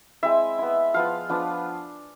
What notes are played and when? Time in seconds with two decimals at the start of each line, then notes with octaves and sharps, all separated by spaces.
0.23 G#3 C4 E4 E5
0.58 B3 E4
0.94 F3 B3 F4 F5
1.29 F3 B3 D4 F4